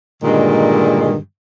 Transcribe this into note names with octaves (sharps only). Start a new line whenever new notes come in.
G2 A#2 D3 D#3 G#3